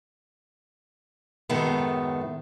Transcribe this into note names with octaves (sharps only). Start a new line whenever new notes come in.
F#2 A2 D#3 G#3 A3 B3